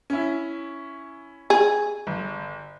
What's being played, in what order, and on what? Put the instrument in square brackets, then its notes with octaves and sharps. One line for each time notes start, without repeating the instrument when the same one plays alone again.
[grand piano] C#4 E4
[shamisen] G#4
[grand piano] G1